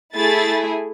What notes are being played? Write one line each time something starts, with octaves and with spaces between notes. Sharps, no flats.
A3 E4 G#4 A6